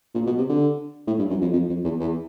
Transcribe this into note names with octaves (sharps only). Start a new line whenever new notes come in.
A#2
B2
C3
D3
A2
G2
F#2
F2
F2
F2
E2
E2